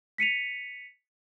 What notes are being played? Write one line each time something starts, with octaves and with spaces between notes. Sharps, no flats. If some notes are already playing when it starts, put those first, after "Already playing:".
B6 C#7 D#7 F7